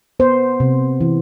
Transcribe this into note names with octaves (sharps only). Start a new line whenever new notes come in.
B3 C5
C3
E3